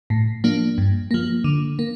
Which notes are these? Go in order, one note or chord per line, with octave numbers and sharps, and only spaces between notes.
A2
F3 A#3 D4
G2
F3 A#3
D3
A#3